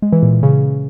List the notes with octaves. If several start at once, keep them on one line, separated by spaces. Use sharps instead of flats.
G#3
E3
A#2
A#2
C#3